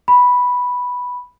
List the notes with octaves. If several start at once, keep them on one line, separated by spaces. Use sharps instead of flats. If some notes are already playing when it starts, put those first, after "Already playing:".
B5